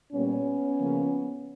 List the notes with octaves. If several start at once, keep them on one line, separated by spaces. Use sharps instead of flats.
A#2 G3 A#3 B3 C#4
C#3 F3 A#3